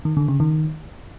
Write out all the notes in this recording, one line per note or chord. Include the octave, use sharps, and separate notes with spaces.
D#3
D3
C#3
D#3